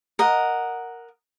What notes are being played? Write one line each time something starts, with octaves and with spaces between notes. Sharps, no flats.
A#4 D#5 F#5